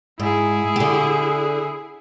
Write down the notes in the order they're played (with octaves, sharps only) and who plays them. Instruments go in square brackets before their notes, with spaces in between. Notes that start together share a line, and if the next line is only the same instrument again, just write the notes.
[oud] G#2 [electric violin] E4 G#4
[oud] D3 G4